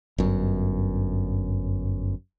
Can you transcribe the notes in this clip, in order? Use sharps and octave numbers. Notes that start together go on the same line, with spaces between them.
G1 F#2